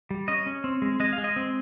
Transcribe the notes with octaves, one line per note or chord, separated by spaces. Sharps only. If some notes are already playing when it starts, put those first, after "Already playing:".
G3
C#4 D#5
C#4
C4
G#3
G#3 D#5
F5
G#3
D#5
C4